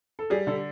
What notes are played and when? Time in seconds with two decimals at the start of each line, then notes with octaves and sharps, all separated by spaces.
0.19 A4
0.30 G3 G#4
0.47 D3 A4